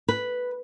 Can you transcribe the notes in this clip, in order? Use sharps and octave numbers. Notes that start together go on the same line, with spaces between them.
B4